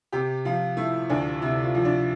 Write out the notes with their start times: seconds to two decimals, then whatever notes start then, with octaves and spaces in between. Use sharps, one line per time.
0.12 C3 G4
0.45 F3 F4
0.77 A3 E4
1.10 D2 D4
1.42 C3 E4
1.63 F4
1.75 F3
1.85 D4